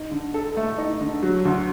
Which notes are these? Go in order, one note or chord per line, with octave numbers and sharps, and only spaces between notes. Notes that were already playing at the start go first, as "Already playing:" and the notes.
Already playing: D#4
D3
A4
A3
D#4
D3
F#3
D2